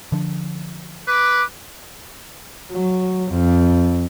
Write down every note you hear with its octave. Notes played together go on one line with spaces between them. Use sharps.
D3 F3 D4
B4 D6
F#3
F2